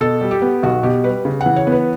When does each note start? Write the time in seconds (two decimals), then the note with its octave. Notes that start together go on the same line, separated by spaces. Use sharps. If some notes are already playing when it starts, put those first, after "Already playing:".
0.01 B2 A4
0.21 G3
0.31 G4
0.42 B3
0.63 B1 F#4
0.83 B2 G4
1.04 G3 B4
1.25 C#3
1.41 F#5
1.46 E3
1.56 C#5
1.67 B3 B4